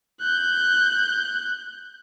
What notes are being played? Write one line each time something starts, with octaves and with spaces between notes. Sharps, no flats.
F#6 G6